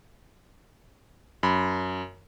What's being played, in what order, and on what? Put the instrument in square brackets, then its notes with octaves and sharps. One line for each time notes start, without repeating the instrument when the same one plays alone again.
[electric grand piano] F#2 B5